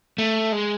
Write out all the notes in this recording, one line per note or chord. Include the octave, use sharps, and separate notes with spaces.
A3
G#3